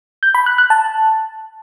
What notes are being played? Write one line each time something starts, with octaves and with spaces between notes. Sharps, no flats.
G6
B5
F#6
F#6
A5